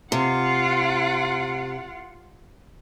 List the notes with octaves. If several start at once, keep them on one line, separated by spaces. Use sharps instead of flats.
C3 F4 F#5